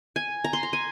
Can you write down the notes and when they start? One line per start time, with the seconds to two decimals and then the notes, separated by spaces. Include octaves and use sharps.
0.16 G#5
0.44 A#5
0.53 C6
0.63 A#5
0.73 G#5